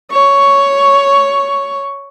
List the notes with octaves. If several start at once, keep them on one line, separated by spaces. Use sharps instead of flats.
C#5 C#6